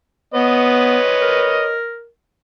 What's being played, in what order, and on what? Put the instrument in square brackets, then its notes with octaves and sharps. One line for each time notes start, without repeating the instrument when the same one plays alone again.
[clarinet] B3 [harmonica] B4 C#5 D#5
[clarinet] A#4